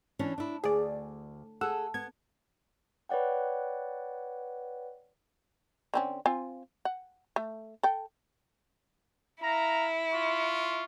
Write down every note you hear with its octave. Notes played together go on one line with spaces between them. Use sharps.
E3 C#4 D4
D4 E4
D2 G#4 D5
G#4 A4 F#5 E6
B3 G#6
B4 C#5 D5 F#5 G5
D3 C4 C#4
C4 F4 G#5
F#5
A3
A4 G5
E4 F5 A#5
F4 C6 C#6